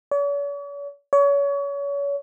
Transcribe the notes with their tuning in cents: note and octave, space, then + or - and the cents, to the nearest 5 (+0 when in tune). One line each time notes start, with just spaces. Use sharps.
C#5 +45
C#5 +30